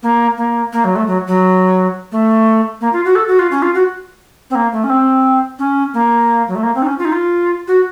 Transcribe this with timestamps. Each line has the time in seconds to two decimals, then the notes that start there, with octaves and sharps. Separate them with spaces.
0.03 A#3
0.37 A#3
0.73 A#3
0.84 F#3
0.96 A3
1.07 F#3
1.27 F#3
2.12 A3
2.81 A#3
2.93 F4
3.05 F#4
3.15 A4
3.28 F#4
3.39 F4
3.51 C#4
3.62 F4
3.74 F#4
4.50 C4
4.55 A#3
4.73 A3
4.84 C#4
4.90 C4
5.59 C#4
5.94 A#3
6.48 F#3
6.55 A3
6.63 A#3
6.75 C4
6.82 D#4
6.87 C#4
6.99 F4
7.05 D#4
7.12 F4
7.68 F#4